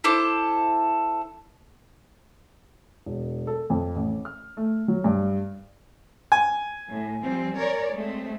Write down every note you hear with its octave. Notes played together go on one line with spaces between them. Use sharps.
E4 A4 C5 D6
E1
A4
F2
A1
F6
A3
F#3
G2
G#5
A2
F3 G3 C4
A#4 C#5 D5
G#3 A3 C4